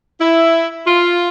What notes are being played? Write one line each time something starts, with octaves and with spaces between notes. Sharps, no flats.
E4
F4